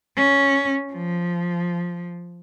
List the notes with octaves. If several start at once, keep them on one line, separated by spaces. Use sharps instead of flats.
C#4
F3